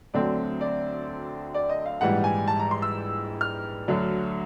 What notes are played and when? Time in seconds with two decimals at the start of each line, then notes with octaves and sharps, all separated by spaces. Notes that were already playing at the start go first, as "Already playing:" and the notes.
0.14 D2 D3 F#3 A3 C4 D5
0.61 D5
1.54 D5
1.69 D#5
1.86 F5
2.01 A#1 G#2 E3 G3 F#5
2.24 G#5
2.48 A5
2.59 A#5
2.71 C6
2.82 E6
3.41 F6
3.88 D2 D3 F#3